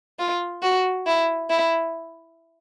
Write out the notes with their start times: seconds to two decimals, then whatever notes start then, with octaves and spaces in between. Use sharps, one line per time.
0.19 F4
0.63 F#4
1.06 E4
1.50 E4